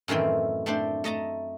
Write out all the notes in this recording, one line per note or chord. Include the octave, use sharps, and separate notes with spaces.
F#2 A2 D#3 E3 C4
A3 C4 D4 C5
A3 D#5 A5 A#5